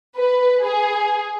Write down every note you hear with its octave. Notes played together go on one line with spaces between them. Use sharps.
B4
G#4